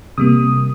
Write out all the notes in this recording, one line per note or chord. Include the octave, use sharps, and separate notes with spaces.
C3 G3 A#3 D#6